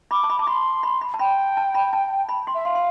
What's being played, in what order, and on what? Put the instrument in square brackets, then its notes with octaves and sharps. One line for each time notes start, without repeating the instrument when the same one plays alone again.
[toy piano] B5 [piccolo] D6
[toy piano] A5
B5
[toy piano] A5 [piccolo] D6
[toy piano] B5 [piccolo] C6
[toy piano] B5
B5
A5
[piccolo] G5 [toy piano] B5
[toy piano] A5
B5
A5
B5
C6
[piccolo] E5
[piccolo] F5 [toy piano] C6
[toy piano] C6